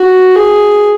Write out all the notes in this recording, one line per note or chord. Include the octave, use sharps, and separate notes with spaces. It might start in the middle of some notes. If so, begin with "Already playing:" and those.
Already playing: F#4
G#4